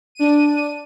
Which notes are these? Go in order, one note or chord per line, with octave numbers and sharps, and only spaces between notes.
D4 D#7